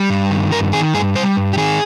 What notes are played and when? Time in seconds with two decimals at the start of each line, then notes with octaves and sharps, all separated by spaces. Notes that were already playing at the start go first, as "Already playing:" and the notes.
Already playing: G3
0.10 G2
0.31 D#3
0.52 G2 A#4
0.73 D#3 G#4
0.94 G2 G#4
1.15 G3 C5
1.37 G2
1.53 G4
1.57 D#3 G#4